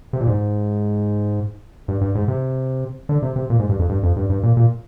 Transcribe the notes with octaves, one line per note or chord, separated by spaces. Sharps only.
C3
A#2
G#2
G2
G2
G#2
C3
D3
C3
C3
A#2
G#2
G2
F2
G2
F2
G2
G2
A#2
A#2